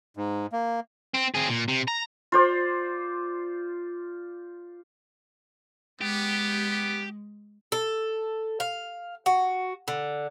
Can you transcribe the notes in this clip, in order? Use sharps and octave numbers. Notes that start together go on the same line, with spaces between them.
G#2
A#3
C4
C4 G#4
A#2
C3
A#5
F4 C5 D5
G#3 B3 G4
A4
F5
F#4
D3